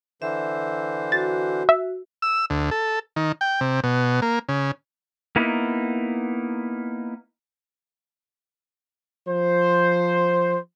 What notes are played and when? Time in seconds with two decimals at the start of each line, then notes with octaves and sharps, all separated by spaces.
0.22 D3 E3 C5 E5
1.12 F#4 A6
1.69 E5
2.22 E6
2.50 D2
2.71 A4
3.16 D#3
3.41 G5
3.61 C3
3.84 B2
4.22 A#3
4.49 C#3
5.36 A#3 B3 D#4 E4
9.28 F3 C5